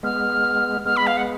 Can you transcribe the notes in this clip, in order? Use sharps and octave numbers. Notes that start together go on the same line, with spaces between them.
G#3 B3 F6
G#3 B3 F6
B5
F5
F#5